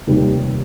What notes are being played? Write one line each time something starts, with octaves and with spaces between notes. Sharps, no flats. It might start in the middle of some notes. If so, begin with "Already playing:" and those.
F1 D#2 D#3 G3